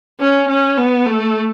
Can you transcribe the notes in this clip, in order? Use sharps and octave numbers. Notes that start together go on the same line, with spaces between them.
C#4
C#4
B3
A3